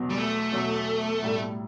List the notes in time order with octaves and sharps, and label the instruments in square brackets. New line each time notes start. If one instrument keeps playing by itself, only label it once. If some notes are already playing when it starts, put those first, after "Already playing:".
Already playing: [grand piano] E2 B2 F#3
[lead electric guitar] G3
A3
[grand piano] E2 B2 F#3
B1 A2 G3